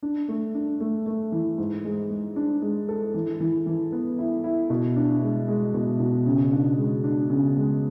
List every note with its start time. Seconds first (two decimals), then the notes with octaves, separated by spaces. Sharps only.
0.03 D4
0.28 A3
0.55 D4
0.80 A3
1.06 A3
1.32 E3
1.58 G#2
1.84 G#3
2.10 G#3
2.36 D4
2.62 G#3
2.89 A4
3.14 E3
3.40 E3
3.66 E3
3.92 B3
4.18 E4
4.44 E4
4.70 B2
4.96 D4
5.22 G#3
5.48 G#3
5.74 B2
6.00 B2
6.26 C#3
6.52 D4
6.78 G#3
7.04 D4
7.30 C#3
7.56 G#3